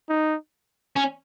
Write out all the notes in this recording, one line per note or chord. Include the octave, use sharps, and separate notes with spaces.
D#4
C#4